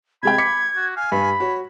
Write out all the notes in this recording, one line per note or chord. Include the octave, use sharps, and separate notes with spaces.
C3 G#3 G5 B5 G#6
D6 B6 C#7
F#4
F5 G#5
G2 B5
F#4 C#5